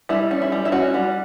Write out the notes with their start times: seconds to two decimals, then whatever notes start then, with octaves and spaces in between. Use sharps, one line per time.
0.09 G3 E4
0.31 C#4
0.42 E4
0.52 G3
0.65 E4
0.72 C#4 F#4
0.94 G3